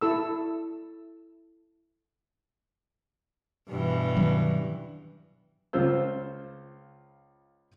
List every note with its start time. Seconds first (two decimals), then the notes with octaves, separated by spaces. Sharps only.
0.01 E4 A4 E6
3.68 G2 B2 E3
4.16 D#3 F#3 C#4
5.73 C#2 C#3 F4 C5 E6